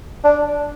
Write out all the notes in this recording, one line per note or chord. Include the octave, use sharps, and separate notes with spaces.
D4